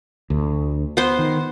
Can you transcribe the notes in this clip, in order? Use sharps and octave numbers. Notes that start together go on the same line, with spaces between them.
D2
B3 C5
D#3